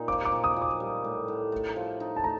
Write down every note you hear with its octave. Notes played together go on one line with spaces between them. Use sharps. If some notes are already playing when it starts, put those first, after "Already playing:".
Already playing: A#2 D#4
F3 D6
D6
A#2
D#6
A#2
D6
G3
A2
A2
A3
F3
D#4
A5
A3 A#5